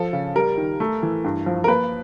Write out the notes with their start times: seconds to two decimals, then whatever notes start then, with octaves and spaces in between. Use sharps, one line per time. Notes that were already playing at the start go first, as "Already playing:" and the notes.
Already playing: F3 A4
0.13 C#3
0.36 G3 A#4
0.57 D#3
0.80 A3
1.03 E3
1.24 G2
1.46 F3
1.64 A#4
1.68 A#3 B4